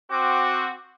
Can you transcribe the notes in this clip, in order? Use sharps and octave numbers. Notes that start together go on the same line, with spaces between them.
C4 F#4 D6